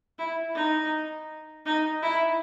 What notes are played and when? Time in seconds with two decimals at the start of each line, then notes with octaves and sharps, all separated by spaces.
0.19 E4
0.55 D#4
1.66 D#4
2.02 E4